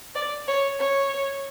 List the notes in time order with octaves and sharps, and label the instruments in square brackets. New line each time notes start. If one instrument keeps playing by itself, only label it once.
[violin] D5
C#5
C#5